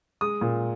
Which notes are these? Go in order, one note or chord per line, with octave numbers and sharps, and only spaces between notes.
G#3 D#6
A#2